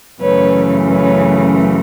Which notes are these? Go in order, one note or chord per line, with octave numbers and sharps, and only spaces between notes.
F#2 C#3 E3 A3 B4 C#5
B4 C#5